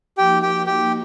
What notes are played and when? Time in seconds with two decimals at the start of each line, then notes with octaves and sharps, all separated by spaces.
0.18 F3 A#3 D#4 F#4 G4 G5
0.42 G4 G5
0.67 G4 G5